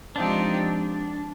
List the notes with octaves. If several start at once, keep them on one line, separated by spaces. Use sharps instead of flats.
F3 G#3 C4 D4 D#4 G4